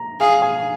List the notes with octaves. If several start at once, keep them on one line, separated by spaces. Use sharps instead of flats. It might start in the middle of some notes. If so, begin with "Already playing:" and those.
Already playing: A#5
G#4 F5
G#5